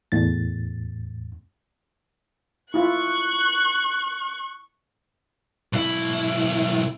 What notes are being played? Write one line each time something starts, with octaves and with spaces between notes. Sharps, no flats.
E2 A2 A6
E4 F4 C#6 F#6
B1 E4